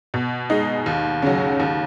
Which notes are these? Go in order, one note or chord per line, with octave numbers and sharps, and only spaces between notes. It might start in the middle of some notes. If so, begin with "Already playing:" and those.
B2
G#3 D#4
D#2
C#3 F#3
D#2